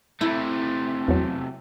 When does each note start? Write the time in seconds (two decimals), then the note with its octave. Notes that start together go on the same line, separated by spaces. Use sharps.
0.21 C3 A3 E4
1.08 E2 F#3